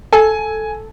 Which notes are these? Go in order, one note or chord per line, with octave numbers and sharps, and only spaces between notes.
A4 G#5